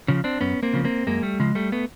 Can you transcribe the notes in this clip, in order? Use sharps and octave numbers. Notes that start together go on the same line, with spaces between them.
C#3 F3
C4 D4
F#2 B3 C#4
A#3 C4
C#3 F3
A#3 C4
F#2 G#3 A#3
G3 A3
C#3 F3 G#3
G3 A3
A3 B3